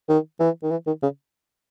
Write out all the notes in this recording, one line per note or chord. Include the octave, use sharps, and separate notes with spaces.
D#3
E3
D#3
E3
D#3
C#3